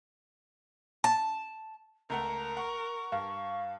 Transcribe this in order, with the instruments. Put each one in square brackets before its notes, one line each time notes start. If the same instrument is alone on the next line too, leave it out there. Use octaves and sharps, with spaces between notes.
[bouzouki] A5
[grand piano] C#2 A3 F#5 [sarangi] A#4 [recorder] A#5
[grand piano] F#5 [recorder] C#6
[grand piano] G2 [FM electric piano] F5